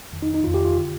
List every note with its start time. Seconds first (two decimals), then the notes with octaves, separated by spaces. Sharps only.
0.13 F2 D#3
0.22 D#4
0.34 D#4
0.44 F2 D#3 F4
0.54 G4
0.65 F4
0.76 D3